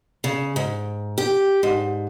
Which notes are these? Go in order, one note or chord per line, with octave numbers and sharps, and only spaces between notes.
C#3
G#2
G4
G#2